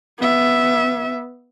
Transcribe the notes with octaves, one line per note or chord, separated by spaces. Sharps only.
B3 E5